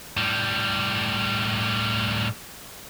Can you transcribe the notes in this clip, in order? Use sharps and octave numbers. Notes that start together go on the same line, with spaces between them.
A2 G3